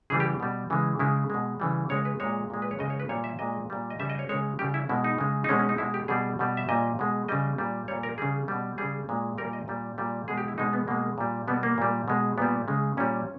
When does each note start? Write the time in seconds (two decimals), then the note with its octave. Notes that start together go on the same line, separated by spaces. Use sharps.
0.10 C#3 E3 G3 G#4
0.20 G4
0.40 B2 G3
0.70 C#3 E3 G#3
0.99 C#3 G#3 E4
1.30 B2 G#3
1.60 C#3 E3 G3
1.89 C#3 G#3 C#5
2.05 B4
2.20 A#2 G#3 C#5
2.50 A#2 G#3
2.62 B4
2.71 C#5
2.79 C#3 G#3 D#5
2.90 C#5
2.99 B4
3.09 A#2 G3 C#5
3.24 E5
3.39 A#2 G#3 D#5
3.70 A#2 G3
3.90 D#5
3.99 C#3 G3 E5
4.10 D#5
4.19 C#5
4.29 C#3 G#3 C#5
4.59 C#3 G3 G4
4.74 E4
4.89 B2 G#3 E4
5.04 D#4
5.18 C#3 G#3
5.44 D#4
5.49 B2 G#3 C#4
5.59 C#4
5.69 D#4
5.78 B2 G#3 E4
5.94 G4
6.08 B2 G3 G#4
6.39 B2 G3
6.57 E5
6.69 A#2 G3 D#5
6.99 B2 G#3
7.28 C#3 G3 D#5
7.58 A#2 G3
7.88 A#2 G3 C#5
8.03 A#4
8.18 C#3 G3 G#4
8.48 B2 G3
8.78 C#3 G3 G#4
9.09 A#2 G#3
9.38 G3 A#4
9.41 A#2
9.53 D#5
9.68 A#2 G3
9.98 A#2 G3
10.28 B2 G#3 G#4
10.37 G4
10.48 E4
10.58 B2 G#3 D#4
10.73 B3
10.87 B2 G#3 A#3
11.18 A#2 G3
11.48 B2 G3 B3
11.63 A#3
11.78 A#2 G3
12.08 B2 G#3
12.38 A#2 G3 B3
12.68 C#3 G#3
12.97 A#2 G3 C#4